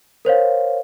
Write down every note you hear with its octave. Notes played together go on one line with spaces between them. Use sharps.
A#4 C5 C#5 F5